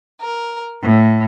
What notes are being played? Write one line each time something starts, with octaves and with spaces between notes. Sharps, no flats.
A#4
A2